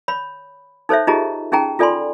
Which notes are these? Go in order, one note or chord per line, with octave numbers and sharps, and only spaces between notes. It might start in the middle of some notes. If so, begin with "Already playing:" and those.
C#5 B5
D#4 A4 C5 C#5 E5
D#4 F4 G4 G#4 D#5 A#5
C#4 D#4 G#4 G5 A#5
F4 A4 D5 G#5 B5 C6